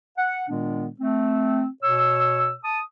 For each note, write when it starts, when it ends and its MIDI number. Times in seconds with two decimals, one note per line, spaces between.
0.18 0.44 78
0.48 0.88 46
0.48 0.88 51
0.48 0.88 56
0.48 0.88 59
0.48 0.88 62
1.00 1.66 57
1.00 1.66 60
1.83 2.54 47
1.83 2.54 73
1.83 2.54 88
2.64 2.80 81
2.64 2.80 87